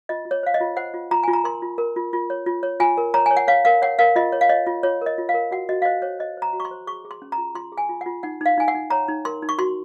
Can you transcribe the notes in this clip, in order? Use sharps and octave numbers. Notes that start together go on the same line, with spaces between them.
F4 D#5
F4
C#5
C5 F5
D#5
F4
C5 F#5
F4
F4 A#5
F4 G#5
A#5
A#4 C6
F4
A#4
F4
F4
C#5
F4
C#5
F4 G#5
A#4
C#5 A#5
C#5 G#5
F#5
C#5 F5
A#4 F5
C#5 F#5
A#4 F5
F4 D#5
C#5
F5
C#5 D#5
F4
F4 C#5
A#4 D#5
F4
F5
A#4
F#4 F#5
F#4 D#5
F5
C5 D#5
C5 C#5
C5 D#5
C5 A#5
F#4
C#6
C6
C5
G#4 C#6
G#4
C6
C#4
A#5
F4
F4 C6
G#4
G#5
F4
F4 F#5
D#4 F#5
D#4 F5
D#4 G#5
F#5
D#4
C#5 A#5
D#4
A#4 C6
D#4
C#6
F#4 C6